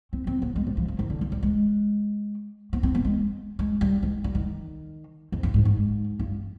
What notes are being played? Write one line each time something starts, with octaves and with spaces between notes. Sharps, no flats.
C4
C4
B3
G#3
G3
F3
F3
D#3
D3
F3
G3
G#3
B3
C4
B3
G#3
G#3
G3
G#3
G3
D#3
F2
G2
G#2
G#2
G2